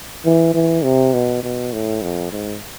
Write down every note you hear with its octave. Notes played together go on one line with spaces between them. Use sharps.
E3
E3
C3
B2
B2
A2
F2
G#2